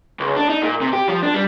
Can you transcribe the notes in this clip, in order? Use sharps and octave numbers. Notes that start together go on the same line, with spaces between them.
C#2
D4
D#4
A#2
C3
G4
F3
D4
G3